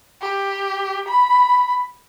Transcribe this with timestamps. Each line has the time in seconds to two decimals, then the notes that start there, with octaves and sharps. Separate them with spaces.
0.22 G4
1.09 B5